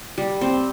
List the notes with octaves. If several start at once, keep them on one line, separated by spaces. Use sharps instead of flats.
G3
C4